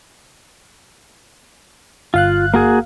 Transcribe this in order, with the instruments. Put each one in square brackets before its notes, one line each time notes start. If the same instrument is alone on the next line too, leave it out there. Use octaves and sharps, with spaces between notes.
[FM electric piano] G1 F5 F#6 [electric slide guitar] F4
[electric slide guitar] A#3 F#4 G#4